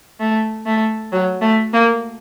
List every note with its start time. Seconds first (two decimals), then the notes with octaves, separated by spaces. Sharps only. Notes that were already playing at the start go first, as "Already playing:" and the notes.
0.20 A3
0.66 A3
1.12 F#3
1.42 A3
1.73 A#3